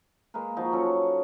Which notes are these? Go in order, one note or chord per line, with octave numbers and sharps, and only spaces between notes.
G#3 A#3 A#4 B4
F3 D#4 F4 F#4
F#3 C#4 A4 C#5